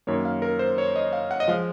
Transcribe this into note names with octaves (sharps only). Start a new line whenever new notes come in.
F#2 D#3 A#3 C#5
F5
A#4
C5
C#5
D#5
F5
F#5
D#5
F3 G#3 F5